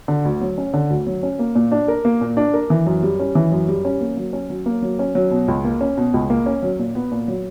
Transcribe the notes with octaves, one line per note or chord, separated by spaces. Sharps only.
D3
D2
F#3
C#4
D3
D2
F#3
C#4
A#3
A#2
D4
A#4
A#3
A#2
D4
A#4
E3
F#2
G3
C#4
E3
F#2
G3
C#4
A#3
F#3
C#4
F#3
A#3
F#3
C#4
F#3
B2
C#2
A#3
C#4
B2
C#2
A#3
C#4
F#3
A#2
B3
A#2
F#3